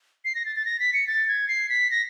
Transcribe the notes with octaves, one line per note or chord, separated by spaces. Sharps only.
C7
A#6
A6
A6
A#6
B6
C#7
A6
G#6
C7
B6
A#6